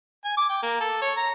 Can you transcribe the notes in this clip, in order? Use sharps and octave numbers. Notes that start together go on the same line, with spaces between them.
G#5
D6
G5
A#3
A4
C#5
A#5